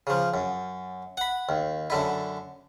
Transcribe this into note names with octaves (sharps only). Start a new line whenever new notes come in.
C#3 F3
F#2
F#5 B5
D#2
F#2 D3 E4